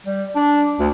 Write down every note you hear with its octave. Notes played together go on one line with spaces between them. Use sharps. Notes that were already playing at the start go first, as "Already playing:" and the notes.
G3
D4
D2